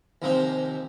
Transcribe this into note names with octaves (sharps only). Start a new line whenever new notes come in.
D#2 G#2 C3 F3 C4 A#5